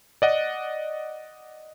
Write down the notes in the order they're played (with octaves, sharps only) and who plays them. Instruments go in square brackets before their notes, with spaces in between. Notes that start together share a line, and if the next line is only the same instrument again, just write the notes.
[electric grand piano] D5 D#5 F#5